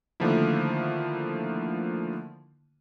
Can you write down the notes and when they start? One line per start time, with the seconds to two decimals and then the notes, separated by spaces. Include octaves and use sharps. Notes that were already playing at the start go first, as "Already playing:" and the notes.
0.20 D3 D#3 F3 A3 A#3 E4